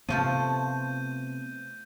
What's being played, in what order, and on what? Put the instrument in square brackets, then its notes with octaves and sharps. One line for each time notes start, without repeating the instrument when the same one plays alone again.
[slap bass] C3 B3 [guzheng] F3 A3 F4 [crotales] G6 D#7